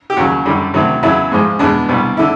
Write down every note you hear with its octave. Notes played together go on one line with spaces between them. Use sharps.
G4
D#2 C#3 F#3 F#4
F#2 D3 G3
D2 C3 D#3 F#3
E2 C#3 F#3 E4
G#2 F3 G#3
E2 B2 G#3 D4
C2 B2 G3
D3 E4